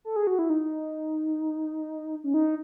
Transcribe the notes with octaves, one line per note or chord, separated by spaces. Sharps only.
A4
G#4
F#4
E4
D#4
C#4
D#4